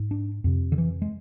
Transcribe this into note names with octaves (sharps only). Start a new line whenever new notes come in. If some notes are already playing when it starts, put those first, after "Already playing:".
Already playing: G#2
D4
F2 C3
D3
E3
G#3